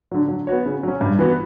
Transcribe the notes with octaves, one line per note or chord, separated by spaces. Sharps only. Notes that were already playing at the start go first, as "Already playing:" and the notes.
D3 F#3
F#3
B3 F#4 C#5
C#3
F#3 C#4
G2
E3 B3 F#4